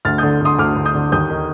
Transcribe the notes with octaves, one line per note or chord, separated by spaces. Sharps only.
D2 F6 A6
D3 D#6 G6
D3 C6 D#6
D2 D6 F6
D2
D#6 G6
D3
D#2 D#6 G6
D#3